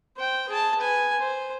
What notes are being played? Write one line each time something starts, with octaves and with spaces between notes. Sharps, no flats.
C5 G5
G#4 A5
B4 G#5
C5